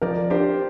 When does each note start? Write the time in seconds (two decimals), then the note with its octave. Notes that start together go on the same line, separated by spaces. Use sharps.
0.02 F3 A#4 D5
0.30 D4 G4 C5